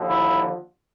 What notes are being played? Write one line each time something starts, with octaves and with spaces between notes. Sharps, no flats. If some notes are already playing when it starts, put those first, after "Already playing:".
Already playing: D#2 D3 F3
E4